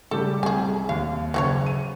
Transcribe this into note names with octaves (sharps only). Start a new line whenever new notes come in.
C#3 G3 G4 A4
C2 G#4 G#5
D#2 F5
F#1 C#3 E3 G#4 C#5
D#7